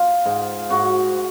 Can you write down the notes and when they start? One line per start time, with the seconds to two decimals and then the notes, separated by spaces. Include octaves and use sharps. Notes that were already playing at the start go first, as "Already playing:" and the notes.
Already playing: F4
0.25 G#2
0.70 G#2 F#4